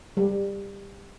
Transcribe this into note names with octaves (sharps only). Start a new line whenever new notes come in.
G3